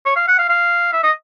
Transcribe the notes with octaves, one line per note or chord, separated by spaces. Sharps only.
C#5
F5
F#5
F5
F5
E5
D#5